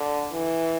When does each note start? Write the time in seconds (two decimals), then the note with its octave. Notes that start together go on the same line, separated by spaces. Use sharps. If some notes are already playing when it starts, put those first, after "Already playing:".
Already playing: D3
0.33 E3